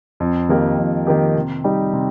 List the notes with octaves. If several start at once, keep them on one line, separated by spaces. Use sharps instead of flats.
F2
D#3 A#3 G4
F2
D#3 A#3 G4
C3
G3 D#4 G4
C3